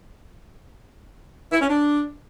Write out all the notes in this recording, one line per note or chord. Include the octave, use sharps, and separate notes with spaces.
E4
C#4
D4